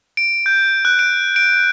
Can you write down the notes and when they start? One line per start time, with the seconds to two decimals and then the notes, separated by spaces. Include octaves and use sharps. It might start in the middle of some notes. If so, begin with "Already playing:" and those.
0.17 D7
0.46 G6
0.85 F#6
0.99 D7
1.36 D7